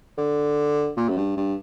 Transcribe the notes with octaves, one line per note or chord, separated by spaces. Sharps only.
D3
A#2
F#2
G2
G2